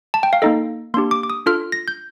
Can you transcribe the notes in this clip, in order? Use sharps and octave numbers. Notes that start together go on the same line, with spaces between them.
A5
G5
F5
A#3 D#4 A4 D#5
A#3 D4 G4 C6
D6
D6
D#6
D4 F4 A4 F6
A#6
G6